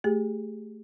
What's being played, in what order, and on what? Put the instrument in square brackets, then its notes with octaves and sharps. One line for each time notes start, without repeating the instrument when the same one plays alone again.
[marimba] A3 G4 G#4